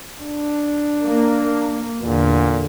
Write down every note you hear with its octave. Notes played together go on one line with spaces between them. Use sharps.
D4
A#3
E2 A#2 D3